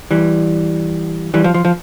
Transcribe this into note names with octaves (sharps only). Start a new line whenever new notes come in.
E3 G3
E3 G3
F3
F3
F3